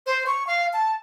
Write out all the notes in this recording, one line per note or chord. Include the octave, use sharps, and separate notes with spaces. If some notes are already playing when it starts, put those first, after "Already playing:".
C5
C#6
F5
A5